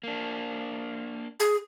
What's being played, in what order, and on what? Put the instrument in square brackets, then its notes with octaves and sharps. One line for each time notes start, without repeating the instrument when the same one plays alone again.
[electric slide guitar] A#3 D4
[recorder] G#4